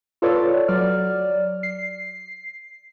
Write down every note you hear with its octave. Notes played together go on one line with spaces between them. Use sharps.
F4 A4 B4 C#5 D5
F#3 D5 F6
C7